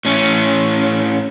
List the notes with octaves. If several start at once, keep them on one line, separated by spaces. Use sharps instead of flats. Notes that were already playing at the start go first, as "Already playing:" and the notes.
A2 C#4